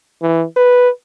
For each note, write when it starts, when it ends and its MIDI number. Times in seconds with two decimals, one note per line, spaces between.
0.22 0.44 52
0.57 0.89 71